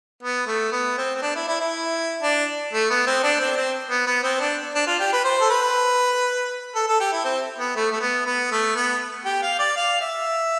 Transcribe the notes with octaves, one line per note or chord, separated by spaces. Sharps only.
B3
A3
B3
C4
C4
D4
E4
E4
E4
D4
A3
B3
C4
D4
C4
C4
B3
B3
C4
D4
D4
F4
G4
B4
C5
A4
B4
A4
A4
G4
E4
C4
B3
A3
A3
B3
B3
A3
B3
G4
F5
D5
F5
E5